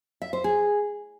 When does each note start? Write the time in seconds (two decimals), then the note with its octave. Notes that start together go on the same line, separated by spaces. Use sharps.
0.22 E5
0.33 C5
0.44 G#4